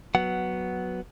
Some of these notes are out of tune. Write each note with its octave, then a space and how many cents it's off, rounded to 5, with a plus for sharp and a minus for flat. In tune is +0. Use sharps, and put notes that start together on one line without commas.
F#3 +0 B3 +0 F#5 +10